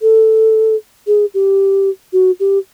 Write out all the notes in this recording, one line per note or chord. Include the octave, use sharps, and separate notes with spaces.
A4
G#4
G4
F#4
G4